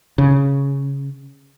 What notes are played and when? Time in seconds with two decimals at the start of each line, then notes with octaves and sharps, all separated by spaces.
0.18 C#3